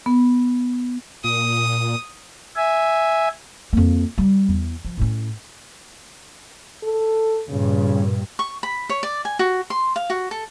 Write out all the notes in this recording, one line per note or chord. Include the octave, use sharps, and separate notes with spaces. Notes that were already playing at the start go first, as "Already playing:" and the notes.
B3
A#2 D#6
E5 G#5
F2 A#3
G3
E2
F3
A2 C#4
A4
G2 A#2 C#3
C#6
B5
C#5
D5
G#5
F#4
C6
F5
F#4
A4